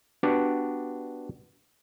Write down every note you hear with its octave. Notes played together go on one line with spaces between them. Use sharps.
B3 D4 F#4 G4 D5